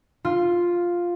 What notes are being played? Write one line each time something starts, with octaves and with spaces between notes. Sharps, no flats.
F4